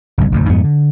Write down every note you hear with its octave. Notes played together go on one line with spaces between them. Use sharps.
G1 C2
F1 D2 G#2
F2 G#2 B3
D3